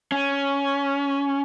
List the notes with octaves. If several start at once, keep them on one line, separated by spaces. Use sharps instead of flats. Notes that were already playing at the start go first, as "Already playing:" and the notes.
C#4